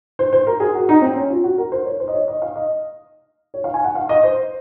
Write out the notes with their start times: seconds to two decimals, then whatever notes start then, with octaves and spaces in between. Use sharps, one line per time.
0.19 C5
0.33 C5
0.47 A#4
0.60 G#4
0.75 F#4
0.89 D#4
1.02 C4
1.16 C#4
1.30 F4
1.43 F#4
1.58 A#4
1.72 C5
1.85 C#5
2.00 C5
2.08 D#5
2.14 C#5
2.28 D#5
2.42 F5
2.56 D#5
3.54 C#5
3.64 F5
3.74 G#5
3.84 F#5
3.95 F5
4.09 D#5
4.23 C5